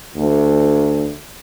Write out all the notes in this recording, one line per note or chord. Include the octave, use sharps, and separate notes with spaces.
D2